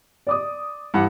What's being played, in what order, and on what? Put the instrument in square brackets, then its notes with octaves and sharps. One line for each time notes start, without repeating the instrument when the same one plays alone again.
[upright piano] D5 D6 D#6
[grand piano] G2 E3 F#5